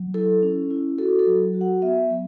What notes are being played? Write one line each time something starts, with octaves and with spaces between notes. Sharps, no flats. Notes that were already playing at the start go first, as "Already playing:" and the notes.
Already playing: F#3
E4 A4
C#4
E4
F#4 A4
A4
F#3
F#4
F#5
B3 E5
F#3